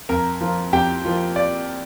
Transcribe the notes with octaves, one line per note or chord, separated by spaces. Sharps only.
F2 A#4 A#5
F3 A#3 F4
F2 G4 G5
F3 A#3 F4
D5